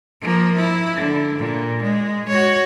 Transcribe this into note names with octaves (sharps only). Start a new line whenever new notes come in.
F3 A#3
E4
D3
A#2
G#3
F#4 C#5